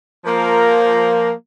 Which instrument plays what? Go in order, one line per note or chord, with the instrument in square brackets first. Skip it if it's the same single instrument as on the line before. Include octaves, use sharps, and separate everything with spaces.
[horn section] F3 A#3 A#4